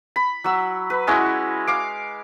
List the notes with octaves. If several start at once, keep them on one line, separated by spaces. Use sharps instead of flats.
B5
F#3 E6
B4
G#3 C#4 E4 F#4
F5 D6